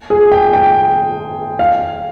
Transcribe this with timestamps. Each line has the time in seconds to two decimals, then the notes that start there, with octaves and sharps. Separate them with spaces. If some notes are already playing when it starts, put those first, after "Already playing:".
0.10 G#4
0.32 G5
0.53 G5
1.59 F5